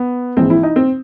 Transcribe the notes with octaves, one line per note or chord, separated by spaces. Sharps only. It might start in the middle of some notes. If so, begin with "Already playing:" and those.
Already playing: B3
A#1 G#2 E3 C4
E4
D#4
C4